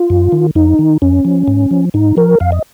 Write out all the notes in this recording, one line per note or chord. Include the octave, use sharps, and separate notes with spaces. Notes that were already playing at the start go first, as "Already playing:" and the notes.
Already playing: F4
F#2
D#3
F2 D#4
D#3
F2 C#4
F3
G#2
F3
G#2 D#4
F3 A#4
F2 F5
D#5